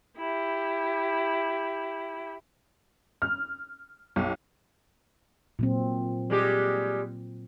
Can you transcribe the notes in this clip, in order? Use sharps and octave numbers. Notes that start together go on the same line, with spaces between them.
E4 G4
F6
B1
A#2 F#3 C4
G3 G#3 G4